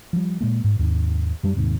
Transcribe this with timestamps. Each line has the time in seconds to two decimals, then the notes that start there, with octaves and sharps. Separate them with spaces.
0.13 F3 G3
0.41 A#2 G#3 A#3
0.64 G#2
0.79 D#2 G#2
1.43 F#2 G3 A3 D4
1.56 D#1 D#2 G#2 C3